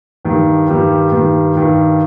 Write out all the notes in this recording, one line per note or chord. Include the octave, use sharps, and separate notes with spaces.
G2 D#3 G3
G2 D#3 G3
G2 D#3 G3
G2 D#3 G3